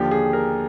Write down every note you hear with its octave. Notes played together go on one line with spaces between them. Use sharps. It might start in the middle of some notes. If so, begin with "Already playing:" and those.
Already playing: D#2 D3 F3 G4
G#4
A#4